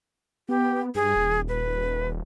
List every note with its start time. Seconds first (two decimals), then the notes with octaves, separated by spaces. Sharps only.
0.49 B3 G4
0.95 G2 G#4
1.16 D#1
1.49 B4